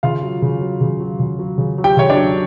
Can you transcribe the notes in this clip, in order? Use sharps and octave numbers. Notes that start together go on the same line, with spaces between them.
C#3 F4 F5
F#3
C#3
F#3
C#3
F#3
C#3
F#3
C#3
F#3
G4 G5
C#3 C#5
D4 D5
F#3